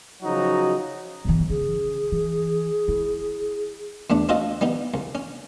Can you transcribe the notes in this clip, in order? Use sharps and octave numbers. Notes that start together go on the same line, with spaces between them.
C#3 F3 F#3 D#4 F#4
G1 E3
C#3 G#4
E3
E4
E2 A3 D4
C4 F4 F#4 A4 D#5
G3 B3 D#4
C2
C#4